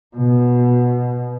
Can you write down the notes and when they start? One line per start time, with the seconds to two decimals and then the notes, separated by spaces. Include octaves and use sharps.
0.16 B2